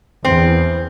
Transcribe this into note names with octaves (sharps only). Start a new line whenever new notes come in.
E2 C4